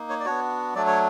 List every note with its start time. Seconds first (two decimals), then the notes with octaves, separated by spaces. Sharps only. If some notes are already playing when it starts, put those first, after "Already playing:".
Already playing: A#3 D#4
0.10 C#5
0.20 D5
0.25 B3 D4 F#4 C#5
0.75 F#3 A3 D4 D5
0.87 C#5